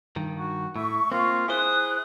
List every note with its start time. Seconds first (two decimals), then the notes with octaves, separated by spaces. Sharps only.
0.16 G2 D#3
0.38 F#4
0.76 A2 E5 C#6
1.12 A#3 C4 F4
1.48 E4 G#4 C5 D#6 F#6